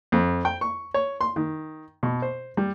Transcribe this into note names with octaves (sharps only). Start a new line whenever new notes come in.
F2
G5
C#6
C#5
C6
D#3
B2
C5
G3